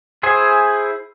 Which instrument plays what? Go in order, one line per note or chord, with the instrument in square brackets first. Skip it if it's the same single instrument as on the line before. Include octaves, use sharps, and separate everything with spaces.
[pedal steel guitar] E4 G#4 C5 G#5